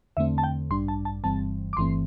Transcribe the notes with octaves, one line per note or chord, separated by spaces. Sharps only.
E2 D3 A3 C4 E5
A5
G5
A1 G2 G3 D4 C6
A5
A5
G1 G2 E3 G3 C4 A5
D6
G1 G2 E3 A3 C4 C6